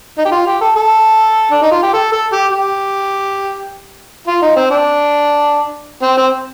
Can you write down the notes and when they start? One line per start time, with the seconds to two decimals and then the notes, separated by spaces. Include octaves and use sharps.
0.18 D#4
0.25 G4
0.31 F4
0.46 G4
0.61 A4
0.76 A4
1.51 D4
1.62 D#4
1.71 F4
1.83 G4
1.93 A4
2.12 A4
2.32 G4
2.51 G4
4.27 F4
4.42 D#4
4.56 C4
4.71 D4
6.02 C4
6.17 C4